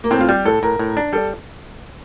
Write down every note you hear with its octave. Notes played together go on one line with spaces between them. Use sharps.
A#3
A2 C4
F4
G3 G4
A2 A4
A2 A#4
A2
D4
G3 A4